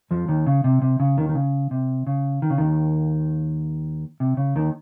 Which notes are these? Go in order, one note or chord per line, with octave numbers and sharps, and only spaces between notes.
F2 F3
D#2 D#3
C#3
C3
C3
C#3
D#2 D#3
D#3
C#3
C3
C#3
D#3
C#3
D#2 D#3
C3
C#3
D#2 D#3